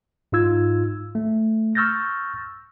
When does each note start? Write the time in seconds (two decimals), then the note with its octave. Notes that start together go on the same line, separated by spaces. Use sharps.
0.32 G#2 D#4 F4 E6 G#6
1.15 A3
1.75 C#6 E6 F6 G6 A6 A#6